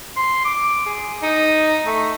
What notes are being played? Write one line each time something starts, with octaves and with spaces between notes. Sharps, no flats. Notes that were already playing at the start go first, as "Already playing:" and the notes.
C6
D6
G#4
D#4
A3